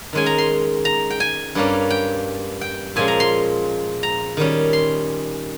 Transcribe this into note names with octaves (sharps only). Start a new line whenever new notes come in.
D#3 G#3 C#4 G#5
A#5
C6
A#5
G5
G#5
G2 G3 A#3 C#4
G5
G5
A#2 F3 G#3 C#4 G#5
A#5
C6
A#5
D#3 G3 C#4
C6